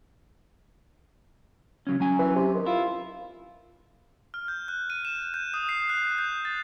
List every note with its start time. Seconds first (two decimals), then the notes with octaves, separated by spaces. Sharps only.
1.87 C#3 F#3 C#4
2.00 F#3 C#4 G#5
2.19 E3
2.36 C3
2.54 D#3
2.66 E4 F4
4.34 F6
4.48 G6
4.68 F#6
4.90 D#7
5.05 E7
5.34 G6
5.54 D#6
5.69 C7
5.89 F#6
6.04 F#6
6.18 G6
6.45 A6